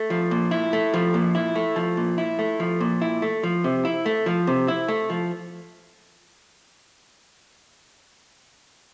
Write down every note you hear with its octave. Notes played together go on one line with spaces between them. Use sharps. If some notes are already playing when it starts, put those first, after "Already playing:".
Already playing: A3
F3
A#2
E4
A3
F3
A#2
E4
A3
F3
A#2
E4
A3
F3
A#2
E4
A3
F3
C3
E4
A3
F3
C3
E4
A3
F3